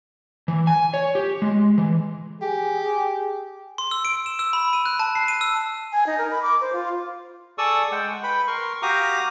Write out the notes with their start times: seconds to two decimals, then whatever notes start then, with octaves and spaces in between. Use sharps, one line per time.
0.48 E3
0.67 G#5
0.94 C#5
1.15 G4
1.42 G#3
1.78 E3
2.42 G4 G#4
3.78 C6
3.91 E6
4.05 D7
4.26 E7
4.39 E6
4.53 B5
4.73 D#7
4.86 F#6
5.00 A5
5.15 C7
5.28 D#7
5.41 E6
5.92 G#5
6.07 D#4
6.18 A#4
6.31 B5
6.42 D6
6.61 C5
6.73 F4
7.58 G#4 A4 D5 C#6 D#6 E6
7.92 G#3 F#5 G5
8.24 B4 G5 B5
8.47 A#4 C6 C#6
8.82 F#4 G4 F5 A#5 D6 D#6